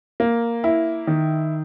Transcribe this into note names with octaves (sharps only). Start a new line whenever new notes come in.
A#3
E4
D#3